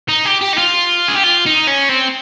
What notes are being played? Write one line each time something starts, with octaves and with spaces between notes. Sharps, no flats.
D#4
G4
G4
D#4
F4
G#4
G4
F4
D#4
C#4
C4